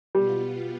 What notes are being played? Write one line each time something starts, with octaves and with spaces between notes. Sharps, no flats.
B2 G3 B3 F4